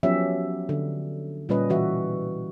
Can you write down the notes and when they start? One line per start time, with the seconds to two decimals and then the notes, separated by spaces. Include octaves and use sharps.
0.03 F3 F#3 B3 C#4 G4 E5
0.69 D3
1.49 A#2 G3 C#4 B4 D#5
1.69 B2 E3 F#4 E5